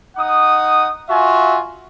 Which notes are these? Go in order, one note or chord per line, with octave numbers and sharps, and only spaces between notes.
D#4 F#5 D#6
F4 F#4 E5 G#5